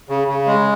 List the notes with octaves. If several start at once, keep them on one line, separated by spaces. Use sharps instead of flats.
C#3
C#3
G#3